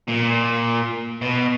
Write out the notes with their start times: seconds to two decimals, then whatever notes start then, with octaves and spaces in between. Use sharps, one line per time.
0.08 A#2
1.21 B2